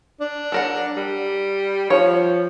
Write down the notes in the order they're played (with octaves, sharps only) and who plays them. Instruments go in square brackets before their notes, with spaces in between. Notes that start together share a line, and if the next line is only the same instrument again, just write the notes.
[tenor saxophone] D4
[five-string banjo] A4 A#4 F#5
[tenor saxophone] G3
[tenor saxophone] F3 [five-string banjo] C#5